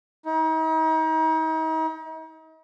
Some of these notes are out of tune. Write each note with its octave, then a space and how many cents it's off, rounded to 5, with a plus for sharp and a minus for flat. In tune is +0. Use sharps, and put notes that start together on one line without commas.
D#4 +40